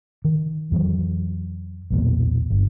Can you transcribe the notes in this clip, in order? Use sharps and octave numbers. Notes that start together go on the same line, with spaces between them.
D#3
F2 E3 F#3
B1 E2 A#2
G1